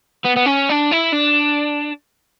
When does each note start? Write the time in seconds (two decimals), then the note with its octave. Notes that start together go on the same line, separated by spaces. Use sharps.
0.25 B3
0.36 B3
0.46 C#4
0.69 D4
0.91 E4
1.12 D4